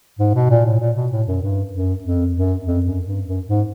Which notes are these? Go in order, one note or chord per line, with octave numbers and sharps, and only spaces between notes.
G#2
B2
A#2
A2
A#2
B2
A2
F#2
G2
F#2
F2
F#2
F2
F#2
G2
F#2
G#2